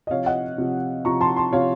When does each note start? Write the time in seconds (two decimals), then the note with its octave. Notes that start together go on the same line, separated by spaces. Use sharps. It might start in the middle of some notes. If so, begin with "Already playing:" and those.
0.07 D#5
0.11 C3 F3 C#5 F5
0.26 D#5 F#5
0.58 C3 F3
1.05 C3 F3 A#5 C#6
1.21 A5 C6
1.36 A5 C6
1.53 C3 F3 C#5 F5